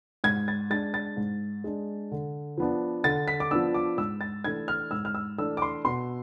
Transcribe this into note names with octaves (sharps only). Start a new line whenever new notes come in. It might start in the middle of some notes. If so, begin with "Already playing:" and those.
G#2 G#6
A6
G#3 D4 A6
A6
G#2
G#3 D4
D3
F3 B3 D4
D3 A6
B6
D6
F3 B3 D4 E6
D6
G#2 E6
A6
E3 A3 D4 G#6
F6
G#2 E6
F6
E6
E3 A3 D4 E6
D6
C6
B2 C6